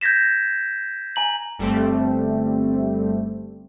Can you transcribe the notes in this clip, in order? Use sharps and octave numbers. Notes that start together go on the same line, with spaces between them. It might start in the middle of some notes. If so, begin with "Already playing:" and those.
G6 G#6 A#6 B6 E7
G#5 A#5 F#7
G1 G3 A3 C4